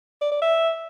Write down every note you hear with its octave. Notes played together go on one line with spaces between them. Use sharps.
D5
D5
E5